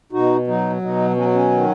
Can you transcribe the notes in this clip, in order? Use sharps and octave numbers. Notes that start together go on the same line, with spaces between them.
B2 D#4 F#4
F#3 D#4
B2 D#4
F#3 C#4
C#4
D#3